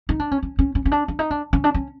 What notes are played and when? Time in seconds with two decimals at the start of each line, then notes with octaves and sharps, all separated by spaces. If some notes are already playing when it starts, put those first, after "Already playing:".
0.09 D#4
0.20 D4
0.31 C#4
0.43 C#4
0.59 C#4
0.75 C#4
0.85 C#4
0.92 D4
1.08 D4
1.19 D#4
1.31 D4
1.53 C#4
1.64 D4
1.74 C#4